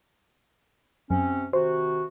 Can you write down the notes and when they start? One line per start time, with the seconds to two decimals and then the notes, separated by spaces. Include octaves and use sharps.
1.10 F#2 C3 C4 C#4
1.53 C3 D#3 F#4 C5